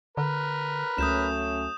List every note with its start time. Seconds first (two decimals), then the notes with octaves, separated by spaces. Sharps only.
0.17 D3 A#4 B4
0.98 C#2 F#3 A3 C#4 D#6 G6 E7